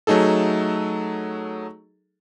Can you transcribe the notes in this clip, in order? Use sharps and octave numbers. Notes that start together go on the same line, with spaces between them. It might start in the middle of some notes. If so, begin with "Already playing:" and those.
F#3 A3 D#4 G#4 A4